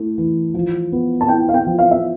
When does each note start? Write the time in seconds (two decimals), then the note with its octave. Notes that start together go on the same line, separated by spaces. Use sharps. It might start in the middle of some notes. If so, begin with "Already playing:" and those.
Already playing: A3 E4
0.18 E3
0.54 F3
0.92 B3
1.21 A5
1.28 E4 G5
1.49 F5
1.54 G5
1.67 F3
1.78 F5
1.91 E5